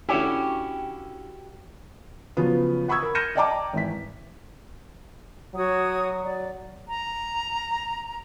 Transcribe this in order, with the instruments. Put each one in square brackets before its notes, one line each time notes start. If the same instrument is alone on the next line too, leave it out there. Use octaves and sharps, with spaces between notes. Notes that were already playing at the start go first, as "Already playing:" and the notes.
[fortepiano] D3 C#4 E4 [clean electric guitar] F#4 G4
[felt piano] C#3 F3 F#3 B3 F4
F#5 B5 C#6 D#6 E6 G#6
A#4
F6 G6 A#6 C#7 D#7 E7
D5 D#5 G5 A5 A#5 D6
G#1 E3 B6
[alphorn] F#3 [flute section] F#4 C#5 D#6
[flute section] D5
[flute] A#5